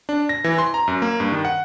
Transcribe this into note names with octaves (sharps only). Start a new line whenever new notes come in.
D4
A#6
E3
C6
A#5
F#2
A#3
G2
D#3
F#5